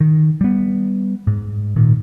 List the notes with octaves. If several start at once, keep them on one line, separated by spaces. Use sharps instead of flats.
D#3
G3 B3
G#2
A#2 D#3